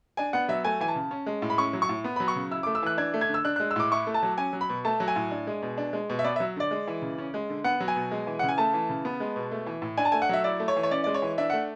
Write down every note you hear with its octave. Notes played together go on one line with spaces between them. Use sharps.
D4 G#5
B3 F#5
F#3 E5
A3 G#5
E3 G#5
A5
C#3
C#4
G#3
A2
B5
C#4 C#6
F#3
C#6
A2
B3
F#3 B5
C#6
C#3
E4 E6
D6
A3
E6
E3 F#6
D4 G#6
A3
G#6
D3
E6
D4 F#6
F#6
G#3
E6
A2 D6
E4 C#6
A3
A5
F#3
C#4 G#5
F#3
B5
B2
A3 A5
F#3
G#5
A2
D4
G#3
B2
D4
G#3
B2
E5
B3 D5
E5
F#3
D3 D5
G#3
E3
C#3
C#4
G#3
D3
B3 F#5
F#3
G#5
B2
G#3
E3
C#3 F#5
G#5
A3 A5
E3
C#3
B3
G#3
B2
A3
E3
A2
D4 G#5
A5
A3 G#5
F#5
F#3 E5
E4 D5
A3
C#5
E3
C#5
C#4 D5
G#3 D5
C#5
E3
D4 E5
A3 F#5